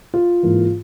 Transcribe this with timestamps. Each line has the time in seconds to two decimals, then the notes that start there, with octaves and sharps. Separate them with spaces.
0.14 F4
0.43 G#2 E3 A#3